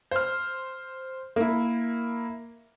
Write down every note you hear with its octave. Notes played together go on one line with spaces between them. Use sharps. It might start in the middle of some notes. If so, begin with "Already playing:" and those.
C5 F6
A#3 E4